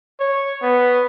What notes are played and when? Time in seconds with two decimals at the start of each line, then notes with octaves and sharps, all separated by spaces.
0.20 C#5
0.62 B3